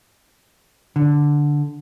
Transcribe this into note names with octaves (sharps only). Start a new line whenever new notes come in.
D3